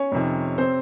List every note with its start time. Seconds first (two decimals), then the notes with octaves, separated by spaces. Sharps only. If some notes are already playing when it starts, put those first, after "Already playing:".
Already playing: C#4 C#5
0.12 F2 C3 D#3
0.58 C3 C4 C5